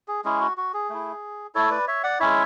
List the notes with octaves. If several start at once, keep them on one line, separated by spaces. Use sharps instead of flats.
G#4
G#3 C#4 E4 G#4
F#4
F#4
G#4
A3 E4
A3 E4 A4 C#5
B4 D5
C#5 E5
D5 F#5
G#3 C#4 E4 C#5 E5